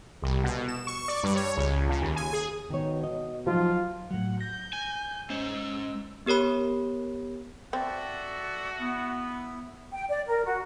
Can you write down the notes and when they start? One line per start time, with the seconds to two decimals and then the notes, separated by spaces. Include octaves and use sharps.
0.22 C2
0.44 B2
0.68 E7
0.87 C#6
1.08 D5
1.23 G2
1.36 C#5
1.57 C#2
1.89 C#3
2.01 D#2
2.16 G#5
2.33 G#4
2.70 B2 D#3 D#4 C#5
3.03 D#5
3.47 F3 F#3 D#4 F4
4.11 A2 F#3 F#5
4.41 G6 A#6
4.73 G#5
5.30 G#3 C#4 C5 E6
6.26 B3 G4 A#4 C#5 B5
7.73 C4 F#4 A4 D5 E5
8.80 B3 E4
9.93 G5
10.09 D5
10.26 A#4
10.45 F#4